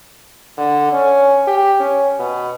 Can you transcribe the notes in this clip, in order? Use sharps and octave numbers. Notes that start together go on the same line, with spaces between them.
D3
C#4
G4
C#4
B2